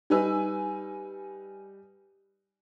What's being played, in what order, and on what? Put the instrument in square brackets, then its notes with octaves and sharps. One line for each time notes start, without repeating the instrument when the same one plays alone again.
[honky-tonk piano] G3 D#4 B4 G#5 E6